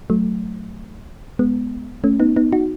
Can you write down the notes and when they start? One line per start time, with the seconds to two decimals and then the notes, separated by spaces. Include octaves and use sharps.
0.10 F#3 A3
1.39 G#3 B3
2.04 A3 C#4
2.20 B3 D#4
2.36 B3 D#4
2.52 D#4 F#4